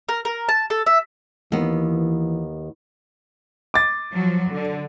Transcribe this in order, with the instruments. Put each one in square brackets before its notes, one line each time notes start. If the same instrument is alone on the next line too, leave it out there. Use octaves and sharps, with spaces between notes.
[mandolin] A#4
A#4
A5
A4
E5
[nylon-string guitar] D#2 B3 [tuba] E3
[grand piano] D6 A6
[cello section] F3 F#3
D3